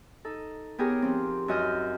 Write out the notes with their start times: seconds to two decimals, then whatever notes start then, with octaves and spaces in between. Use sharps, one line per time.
0.25 D#4 A4
0.78 B3 G4 G#4 A#4 C#5
1.02 F3 C4
1.48 F#2 F#4 D#5 F6 G6